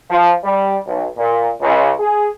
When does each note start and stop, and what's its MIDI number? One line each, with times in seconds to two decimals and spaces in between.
0.10 0.33 53
0.44 0.75 55
0.87 1.06 35
1.17 1.49 46
1.61 1.91 37
2.00 2.29 68